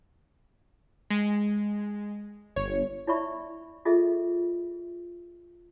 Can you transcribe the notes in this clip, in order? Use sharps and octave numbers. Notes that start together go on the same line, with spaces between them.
G#3
G1 C#5
E4 C#5 D5 E5 B5 C#6
F4 G#4 A4 D#5 E5